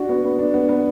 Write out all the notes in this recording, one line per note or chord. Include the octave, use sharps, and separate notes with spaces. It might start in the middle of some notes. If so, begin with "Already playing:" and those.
Already playing: D4 F#4
B3
B3
D4
B3
B3